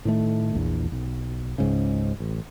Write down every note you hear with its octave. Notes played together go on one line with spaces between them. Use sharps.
A2 D#3 A3
A#1 E2
B1
C#2 G#2 C#3
A1